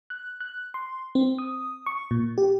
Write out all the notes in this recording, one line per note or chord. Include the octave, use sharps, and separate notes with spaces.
F#6
F#6
C6
C4
D#6
C#6
A#2
G4